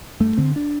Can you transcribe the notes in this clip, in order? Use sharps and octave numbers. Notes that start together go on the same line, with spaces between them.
G2 A3
D3 C4
D4